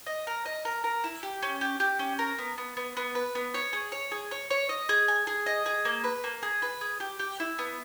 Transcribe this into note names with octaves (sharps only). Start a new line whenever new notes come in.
D#5
A#4
D#5
A#4
A#4
E4
G4
C#4
G4
G4
C#4
A#4
B3
B3
B3
B3
B4
B3
C#5
G#4
C#5
G#4
C#5
C#5
D#5
G#4
G#5
G#4
D#5
G#4
A#3
B4
A#3
G#4
B4
G#4
G4
G4
E4
B3